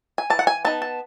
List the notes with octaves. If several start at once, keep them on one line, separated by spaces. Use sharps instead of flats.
G#5
E3 A5
F#5
G#5
B3 D#4 A5
A5